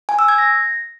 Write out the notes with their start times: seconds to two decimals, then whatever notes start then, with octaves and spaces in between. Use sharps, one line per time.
0.09 G#5
0.19 E6
0.28 G#6
0.38 A#6